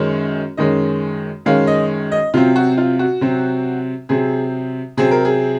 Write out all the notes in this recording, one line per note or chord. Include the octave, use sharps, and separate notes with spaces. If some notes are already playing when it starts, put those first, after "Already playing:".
Already playing: F#2 D#3 G#3 C#4
F#2 D#3 G#3 C#4 D#5
F#2 D#3 G#3 C#4 F5
D#5
D#5
C3 F#3 C4 F4
F#4
F4
F#4
C3 F#3 C4
C3 F#3 C4 G#4
C3 F#3 C4 G#4
A#4
G#4